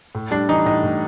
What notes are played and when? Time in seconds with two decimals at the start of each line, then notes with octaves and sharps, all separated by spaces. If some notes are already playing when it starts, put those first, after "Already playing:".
0.15 A2
0.31 G3 D4
0.49 E3 D#4
0.65 A2 D#4
0.83 A2